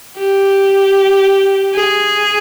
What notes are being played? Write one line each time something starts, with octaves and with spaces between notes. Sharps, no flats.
G4
G#4